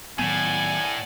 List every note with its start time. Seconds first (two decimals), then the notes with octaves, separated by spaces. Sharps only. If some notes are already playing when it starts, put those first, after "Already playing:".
0.19 A2 D#3 F#3 B3 D5 F#5 G#5